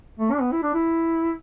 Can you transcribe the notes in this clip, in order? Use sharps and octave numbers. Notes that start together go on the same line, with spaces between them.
A3
D4
B3
E4
D4
E4